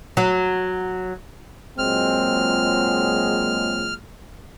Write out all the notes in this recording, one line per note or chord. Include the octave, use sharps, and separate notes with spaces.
F#3
A#2 F#3 G#3 C4 F6